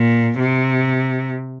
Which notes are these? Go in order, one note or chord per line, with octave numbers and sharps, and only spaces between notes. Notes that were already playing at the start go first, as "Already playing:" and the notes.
Already playing: A#2
C3